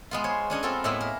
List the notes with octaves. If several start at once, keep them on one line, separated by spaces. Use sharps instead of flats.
G#3 B3 F4
C5 C#5
C#4 D4 C#5 D#5
B3 C4 F4 A4 A#4
A2 G#3 A#3 B3 E4 E5
A#4